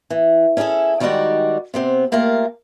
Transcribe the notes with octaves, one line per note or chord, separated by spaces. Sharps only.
E3
C#4 D4 E4 G#4 A4
D#3 G3 G#3 D#4 F#4 D5
C3 B3 C4
A3 A#3 F4 G4 A#4